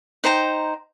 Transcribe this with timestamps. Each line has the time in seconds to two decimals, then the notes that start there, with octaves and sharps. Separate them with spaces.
0.24 D#4 C5 G5 A#5